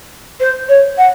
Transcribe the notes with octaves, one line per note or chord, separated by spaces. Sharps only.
C5
C#5
F#5